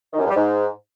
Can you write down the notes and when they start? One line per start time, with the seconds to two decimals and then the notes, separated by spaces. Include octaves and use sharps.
0.13 D#3
0.19 F#2
0.25 E2
0.30 G3
0.36 G#2